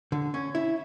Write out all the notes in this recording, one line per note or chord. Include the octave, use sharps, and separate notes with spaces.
D3
C#4
E4